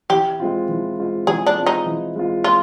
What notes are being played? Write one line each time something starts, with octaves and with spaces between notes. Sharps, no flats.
E3 G4
G#3 C4 F4
E3
G#3 C4 F4
E3 G#4
D4
G#3 C4 F4
D#4
E3
G#3 C4 F4
F4